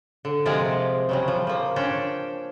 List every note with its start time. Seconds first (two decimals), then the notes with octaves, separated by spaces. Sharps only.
0.25 D3
0.46 C3 F3 G#3 G#4 A#4 D5
1.09 C#3 F#3 G3
1.28 F3
1.47 F3 A#3
1.76 C#4 D4 G5